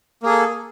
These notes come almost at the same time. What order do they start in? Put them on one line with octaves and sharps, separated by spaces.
A#3 G#4 A4